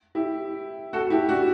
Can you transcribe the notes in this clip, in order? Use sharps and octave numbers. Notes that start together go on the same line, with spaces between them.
E4 G4
F#4 A4
E4 G4
D4 F#4